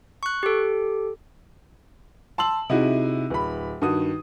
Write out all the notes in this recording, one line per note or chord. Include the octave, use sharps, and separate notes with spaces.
C#6 F#6
G4 A4
A5 C6 E6 F#7
C3 D#4 E4 F#4 G#4
D1 B5
G2 D#3 F#4 D#6